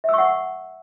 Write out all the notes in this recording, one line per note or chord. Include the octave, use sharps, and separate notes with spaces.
E5 F#5 C#6 E6